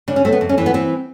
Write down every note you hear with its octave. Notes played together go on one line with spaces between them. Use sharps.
C#3 D4
C#4
A3 C4
B3
F2
C#4
E3 C4
B3
E3 C4